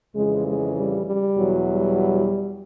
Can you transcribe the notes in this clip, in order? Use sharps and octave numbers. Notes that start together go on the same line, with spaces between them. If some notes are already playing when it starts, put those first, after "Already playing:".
F2 C#3 E3 G#3
G#3
G3
G3
E2 B2 F#3
G3